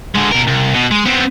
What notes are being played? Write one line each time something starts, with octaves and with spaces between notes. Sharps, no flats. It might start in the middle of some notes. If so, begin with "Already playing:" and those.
D3 G#3
B2 A#4
C2
B2
G#3
B3 C4